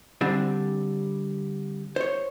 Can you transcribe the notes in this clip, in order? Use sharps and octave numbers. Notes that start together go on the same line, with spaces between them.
D3 G3 C4
C5 C#5